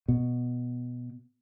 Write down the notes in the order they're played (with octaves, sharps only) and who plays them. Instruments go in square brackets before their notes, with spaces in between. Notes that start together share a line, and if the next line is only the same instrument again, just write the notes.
[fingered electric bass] B2